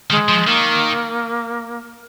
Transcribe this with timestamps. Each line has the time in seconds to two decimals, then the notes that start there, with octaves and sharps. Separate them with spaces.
0.10 D#3 G#3
0.29 F3
0.47 D#3 A#3